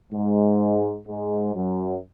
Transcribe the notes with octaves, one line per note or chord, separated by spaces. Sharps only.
G#2 G#3
G#2 G#3
F#2 F#3